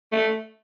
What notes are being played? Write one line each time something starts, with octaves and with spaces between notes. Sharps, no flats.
A3